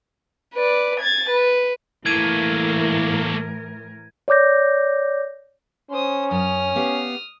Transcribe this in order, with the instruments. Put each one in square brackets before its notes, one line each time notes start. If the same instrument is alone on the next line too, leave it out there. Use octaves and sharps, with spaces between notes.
[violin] B4 D5
G#6 A6
B4
[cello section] A2 E3 A#4 [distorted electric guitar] A3 A#3 [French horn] E4 [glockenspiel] G#6 D#7
[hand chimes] C#5 D5 D6 G6 A#6
[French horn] C#4 [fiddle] C5 D#6
[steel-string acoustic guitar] F#2 [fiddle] D#6 F6
[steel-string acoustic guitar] B3 G4 F5